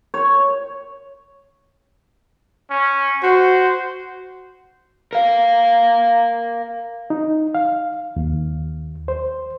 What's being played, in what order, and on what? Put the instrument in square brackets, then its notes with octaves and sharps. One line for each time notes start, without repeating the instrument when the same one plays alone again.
[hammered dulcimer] C#5
[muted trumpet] C#4
[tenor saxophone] F#4 [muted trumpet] C5
[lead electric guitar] A#4 F5
[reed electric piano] D#4
F5
D#2
C5